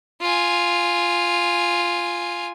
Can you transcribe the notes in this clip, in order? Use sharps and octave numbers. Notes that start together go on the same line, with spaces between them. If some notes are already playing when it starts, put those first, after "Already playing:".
F4 G#5